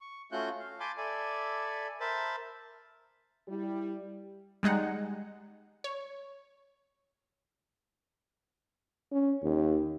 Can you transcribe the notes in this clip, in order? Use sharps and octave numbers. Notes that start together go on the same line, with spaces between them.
C#6
A3 C#4 F4 F#4 F#6 G6
F5
G#5 A5 B5 C6 D6 G6
A4 D5 E5 G#5 B5
A#4 C5 E5 A5 B5
G3 E4
G3 G#3 D#4 F#5
C#5
C#4
D#2